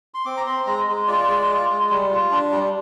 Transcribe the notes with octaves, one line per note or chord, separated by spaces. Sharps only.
C6
C4 D6
A#5
C4 C6
G#3 A#5
G#3
F4 D5
G#3
F4
G#3
G3
F4
D4
G3